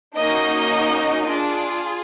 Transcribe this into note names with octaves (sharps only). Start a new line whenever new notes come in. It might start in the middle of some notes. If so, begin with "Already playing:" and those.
A#3 C#4 D#4 F#4 D#5
D4 F4 G#4